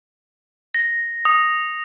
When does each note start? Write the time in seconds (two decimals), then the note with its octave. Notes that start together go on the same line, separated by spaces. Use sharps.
0.74 A#6
1.25 D#6